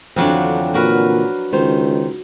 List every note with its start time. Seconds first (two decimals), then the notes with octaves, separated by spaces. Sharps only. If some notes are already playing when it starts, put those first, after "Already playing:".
0.16 F2 D3 E3 F#3 C4 D4
0.74 A#2 F#4 A#4 B4
1.53 C#2 D#3 C5